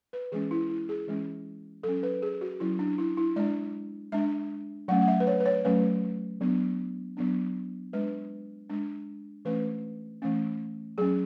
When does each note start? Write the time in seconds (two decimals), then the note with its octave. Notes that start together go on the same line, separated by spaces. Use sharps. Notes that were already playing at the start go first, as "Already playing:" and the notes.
0.13 B4
0.32 E3 G#3 C#4 G#4
0.51 E4
0.70 E4
0.89 G#4
1.08 E3 G#3 C#4
1.83 F#3 C#4 A4
2.03 B4
2.22 G#4
2.41 F#4
2.60 F#3 C#4 E4
2.79 D4
2.98 E4
3.17 E4
3.36 G#3 D4 D5
4.12 G#3 D4 E5
4.88 F#3 A3 C#4 F#5
5.02 F#5
5.08 E5
5.20 B4
5.27 C#5
5.40 B4
5.46 C#5
5.65 F#3 A3 C#4 B4
6.41 F#3 B3 D4
7.17 F#3 B3 D4
7.93 G#3 D4 B4
8.69 G#3 D4
9.45 E3 A3 C#4 B4
10.22 E3 A3 C#4
10.98 F#3 C#4 G#4